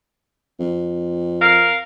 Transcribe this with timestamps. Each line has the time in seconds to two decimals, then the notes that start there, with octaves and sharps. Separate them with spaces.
0.60 F2
1.41 A#4 F5